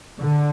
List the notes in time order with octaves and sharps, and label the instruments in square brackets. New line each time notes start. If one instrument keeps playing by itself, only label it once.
[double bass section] D3